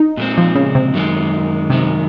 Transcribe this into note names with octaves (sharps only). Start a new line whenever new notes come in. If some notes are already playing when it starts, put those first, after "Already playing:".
Already playing: D#4
A#2 G#3 C4
F3
C#3
C3
F#2 D#3 G#3
F#2 C3 D#3 G#3